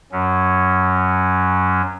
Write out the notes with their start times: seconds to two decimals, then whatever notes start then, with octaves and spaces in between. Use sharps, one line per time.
0.12 F#2 F#3 C#4